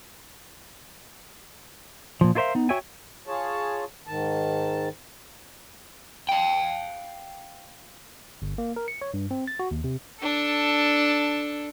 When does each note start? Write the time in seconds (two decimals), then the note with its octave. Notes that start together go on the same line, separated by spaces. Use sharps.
2.21 A#2 F3
2.35 E4 F4 A#4 C5 E5 F5
2.55 B3 D#4
2.69 F#4 C#5 E5 G5 G#5
3.27 F4 G#4 C#5 A5
4.07 G#2 D#3 A5
6.29 F5 G5
8.42 G1
8.58 A#3
8.76 A#4
8.88 C#7
9.01 C#5
9.14 G2
9.31 C4
9.47 A6
9.59 F#4
9.71 D#2
9.84 C3
10.20 D4 A4